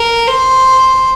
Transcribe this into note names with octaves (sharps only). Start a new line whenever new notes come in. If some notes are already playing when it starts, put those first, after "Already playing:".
Already playing: A#4
C5